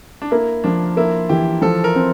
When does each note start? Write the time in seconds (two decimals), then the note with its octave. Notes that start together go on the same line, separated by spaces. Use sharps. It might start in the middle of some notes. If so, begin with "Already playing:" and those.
0.22 D4
0.31 A#3 E4
0.64 F3 D4
0.97 A#3 E4
1.29 E3 G4
1.62 F3 A4
1.84 A#4
1.95 C4